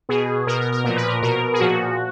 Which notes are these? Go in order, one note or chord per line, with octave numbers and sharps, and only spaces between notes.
B2 G#4
B2 A#4
A#4
A#4
A#2 F3 A#4
B4
A#4
B2 A#4
G#4
A#2 F3 F#4